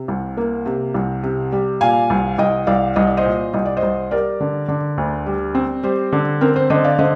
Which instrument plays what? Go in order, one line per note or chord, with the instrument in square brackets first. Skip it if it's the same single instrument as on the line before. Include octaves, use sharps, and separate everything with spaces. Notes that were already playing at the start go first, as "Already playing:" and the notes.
Already playing: [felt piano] C3
C2
A#3
C3
C2
C3
G3
A#2 F5 G#5
C2
C2 D#5 G5
C2 D5 F5
C2 D#5
D5
C5 D#5
A#2
C2 D#5
D5
C5 D#5
C2
G3 A#4 D5
D3
D3
D2
G3
C4
G3 C5
D3
C4 A#4
C5
D3 C5 D#5
D5 F5
D3 C5 D#5